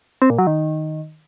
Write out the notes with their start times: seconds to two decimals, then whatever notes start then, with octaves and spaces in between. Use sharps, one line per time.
0.22 C4
0.30 A#2
0.38 F#3
0.47 D#3